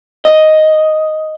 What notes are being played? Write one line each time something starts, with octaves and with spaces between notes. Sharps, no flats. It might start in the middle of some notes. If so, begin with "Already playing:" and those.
D#5